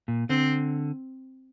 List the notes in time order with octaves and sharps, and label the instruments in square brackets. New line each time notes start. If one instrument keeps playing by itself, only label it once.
[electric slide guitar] A#2
[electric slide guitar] D3 [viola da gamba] C4